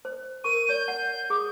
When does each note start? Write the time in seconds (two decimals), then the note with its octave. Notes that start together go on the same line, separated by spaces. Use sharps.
0.05 C5
0.44 A#4 C#6 D#7
0.69 C#5 D5 G6
0.88 F#5
1.30 G#4 D6 D#6